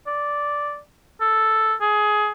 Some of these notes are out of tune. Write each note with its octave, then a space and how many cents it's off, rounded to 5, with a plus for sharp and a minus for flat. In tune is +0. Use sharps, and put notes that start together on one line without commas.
D5 -5
A4 +0
G#4 +20